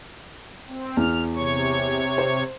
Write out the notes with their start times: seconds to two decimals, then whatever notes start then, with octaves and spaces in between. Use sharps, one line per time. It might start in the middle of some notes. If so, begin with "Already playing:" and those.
0.68 C4
0.97 E2 F6
1.36 C3 C#5 C#6
2.18 C5